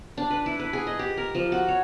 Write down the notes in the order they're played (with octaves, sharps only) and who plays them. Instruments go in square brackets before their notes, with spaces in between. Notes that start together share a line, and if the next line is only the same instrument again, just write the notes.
[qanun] D4
B4
E4
B4
G#4
D#5
G4
A#4
F3
F#4
C#5